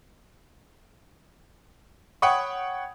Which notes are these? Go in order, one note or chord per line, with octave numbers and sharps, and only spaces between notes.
C#5 F#5 G5 B5 C#6 D#6